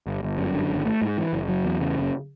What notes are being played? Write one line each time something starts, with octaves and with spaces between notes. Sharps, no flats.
G1
G1
F#2
D3
G#1
A3
G#2
E3
F#1
F#3
E2
C#3
F#1